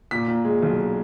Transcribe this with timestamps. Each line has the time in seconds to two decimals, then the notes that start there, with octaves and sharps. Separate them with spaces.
0.11 A#2 B6
0.28 A#2
0.45 G#3
0.62 B1